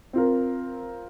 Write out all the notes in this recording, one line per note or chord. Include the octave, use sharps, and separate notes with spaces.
C4 F4 A#4